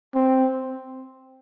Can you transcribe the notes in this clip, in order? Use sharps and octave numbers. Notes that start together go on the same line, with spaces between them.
C4